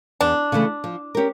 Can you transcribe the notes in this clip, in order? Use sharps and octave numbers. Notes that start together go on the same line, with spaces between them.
E2 D4
C#3 E3 A3
F3
C#4 G4 A#4